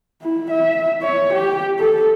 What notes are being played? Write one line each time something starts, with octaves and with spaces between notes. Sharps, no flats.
E4
E5
C#5
G4
A4